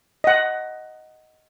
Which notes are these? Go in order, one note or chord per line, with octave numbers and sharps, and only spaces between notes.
D#5 F#5